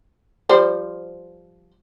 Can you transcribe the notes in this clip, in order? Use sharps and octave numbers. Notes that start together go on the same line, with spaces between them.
F3 G3 C5